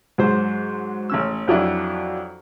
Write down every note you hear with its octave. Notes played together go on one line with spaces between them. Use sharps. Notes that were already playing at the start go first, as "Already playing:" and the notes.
G#2 F#3 C5
A1 C#4 E6
F2 F#3 D4 E4